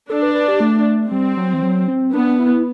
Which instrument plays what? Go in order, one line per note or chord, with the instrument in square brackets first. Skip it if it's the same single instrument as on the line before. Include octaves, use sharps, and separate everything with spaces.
[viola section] D4 [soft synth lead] A4
[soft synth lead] B4
B4
G4
A3
[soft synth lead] G3 [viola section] C4
[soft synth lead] F#3
E3
F#3
C4
[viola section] B3 [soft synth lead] D4
[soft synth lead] E4